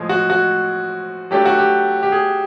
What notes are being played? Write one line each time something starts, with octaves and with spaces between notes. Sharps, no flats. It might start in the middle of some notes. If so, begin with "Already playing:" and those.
Already playing: A2 F3 G#3
F#4
F#4
F#3 A3 D4 G4
F#4
G4
G4
G#4